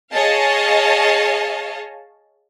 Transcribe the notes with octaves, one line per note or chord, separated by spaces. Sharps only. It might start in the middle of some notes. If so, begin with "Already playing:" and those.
G#4 C#5 D#5 F5 A5